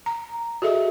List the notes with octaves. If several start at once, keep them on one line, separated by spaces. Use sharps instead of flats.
A#5
F#4 G#4 A4 D#5 E5